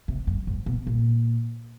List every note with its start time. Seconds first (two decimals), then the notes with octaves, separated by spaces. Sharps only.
0.08 C3
0.27 F#2
0.47 G#2
0.66 B2
0.87 A#2